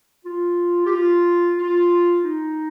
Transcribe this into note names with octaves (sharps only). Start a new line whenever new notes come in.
F4
G4
F4
F4
D#4